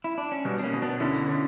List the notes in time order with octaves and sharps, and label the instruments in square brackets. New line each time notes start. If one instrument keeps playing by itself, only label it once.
[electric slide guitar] E4
D4
C#4
[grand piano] B2 [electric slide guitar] G3 B3
[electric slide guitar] D4
A#3 C#4
[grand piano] B2
[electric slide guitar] B3 D4
[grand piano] D3 [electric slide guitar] C#4 E4
[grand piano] D3